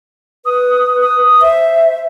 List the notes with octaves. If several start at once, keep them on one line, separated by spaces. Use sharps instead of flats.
B4 D#6
D#6
C5 E5